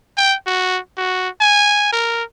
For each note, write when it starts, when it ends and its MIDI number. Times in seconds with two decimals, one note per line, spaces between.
0.17 0.35 79
0.46 0.79 66
0.97 1.28 66
1.40 1.89 80
1.92 2.23 70